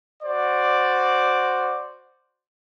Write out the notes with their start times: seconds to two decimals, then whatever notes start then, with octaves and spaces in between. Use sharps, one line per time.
0.23 F#4 C5 D5